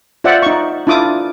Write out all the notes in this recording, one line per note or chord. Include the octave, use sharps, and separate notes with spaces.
F4 C5 D5 E5 F#5
D#4 C#6
D4 E4 F4 D6 D#6